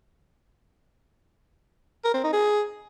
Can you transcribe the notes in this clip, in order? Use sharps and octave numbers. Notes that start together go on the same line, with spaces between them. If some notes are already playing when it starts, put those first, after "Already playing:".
A#4
C4
D#4
G#4